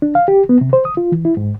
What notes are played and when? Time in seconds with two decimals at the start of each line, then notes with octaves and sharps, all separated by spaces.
0.02 D4
0.15 F5
0.28 G4
0.49 B3
0.61 C3
0.73 C5
0.85 D#6
0.97 F4
1.12 E3
1.25 E4
1.37 G#2